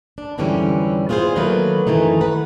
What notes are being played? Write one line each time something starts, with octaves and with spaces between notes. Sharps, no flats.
D4
F2 G#2 D3 E3 G3 C#4
B3 F4 G#4 B4 C5
D#3 F#3 A3 A#3 B4
F#2 D#3 E3 A3 D#4
B4 F#5